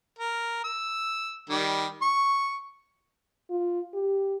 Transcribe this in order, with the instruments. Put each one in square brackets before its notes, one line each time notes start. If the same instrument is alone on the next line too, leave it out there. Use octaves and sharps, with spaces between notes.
[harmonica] A#4
E6
D#3 G3
C#6
[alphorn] F4
G4